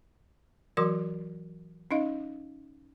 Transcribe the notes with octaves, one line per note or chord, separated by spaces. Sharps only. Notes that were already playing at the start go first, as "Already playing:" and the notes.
E3 F#3 F#4 A#4 C6 D6
C#4 D#4 D#5 F5